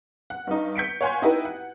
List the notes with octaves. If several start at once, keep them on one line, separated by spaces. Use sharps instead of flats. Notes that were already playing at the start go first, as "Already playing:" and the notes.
F#5
G2 D#4
G6 B6 C#7 D7
C#5 F5 F#5 G#5 C6 G#6
D#4 E4 G4 B4
F#5